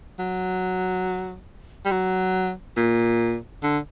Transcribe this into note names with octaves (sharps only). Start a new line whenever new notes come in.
F#3
G3
F#3
A#2
D3